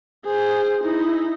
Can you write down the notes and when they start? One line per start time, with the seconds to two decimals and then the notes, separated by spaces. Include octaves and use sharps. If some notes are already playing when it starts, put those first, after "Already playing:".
0.25 G#4 C5
0.83 D#4 E4